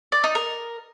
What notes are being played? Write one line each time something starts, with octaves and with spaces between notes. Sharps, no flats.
D5
D#4
A#4